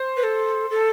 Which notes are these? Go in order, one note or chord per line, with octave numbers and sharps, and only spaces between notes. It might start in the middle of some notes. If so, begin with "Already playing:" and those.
Already playing: C5
B4
A4
A4